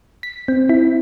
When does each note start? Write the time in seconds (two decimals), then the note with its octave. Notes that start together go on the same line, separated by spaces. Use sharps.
0.23 B6
0.48 C4
0.69 E4